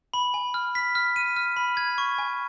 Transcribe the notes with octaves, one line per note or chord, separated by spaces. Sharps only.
B5
G#5
F6
B6
F6
D#7
F6
B5
G#6
C#6
G#5